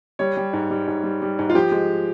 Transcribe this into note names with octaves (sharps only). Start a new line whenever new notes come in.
G3 C#5
G3
G#2
G3
G#2
G3
G3
G#2
F4
F3 G4
G#3